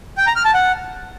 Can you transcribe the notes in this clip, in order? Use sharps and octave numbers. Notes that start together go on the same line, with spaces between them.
G5
A#5
F6
A5
F#5